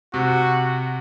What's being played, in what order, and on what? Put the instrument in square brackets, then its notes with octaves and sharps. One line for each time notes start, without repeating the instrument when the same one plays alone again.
[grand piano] C3 [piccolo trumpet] F#4